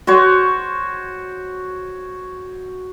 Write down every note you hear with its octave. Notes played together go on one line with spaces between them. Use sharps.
F#4 C5 C#5